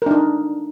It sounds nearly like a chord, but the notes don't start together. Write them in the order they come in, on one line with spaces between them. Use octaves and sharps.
A#4 D4 D#4